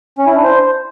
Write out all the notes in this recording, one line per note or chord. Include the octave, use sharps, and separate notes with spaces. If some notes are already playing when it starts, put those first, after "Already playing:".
C#4
E4
D4
C5